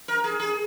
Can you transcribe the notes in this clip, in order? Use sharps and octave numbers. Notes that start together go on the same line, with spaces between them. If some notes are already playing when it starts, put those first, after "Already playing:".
A#4
G#4
G#4